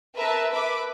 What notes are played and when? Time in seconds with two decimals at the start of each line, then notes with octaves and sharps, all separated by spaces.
0.17 A#4 B4 E5 A5
0.52 B4 E5 B5 D6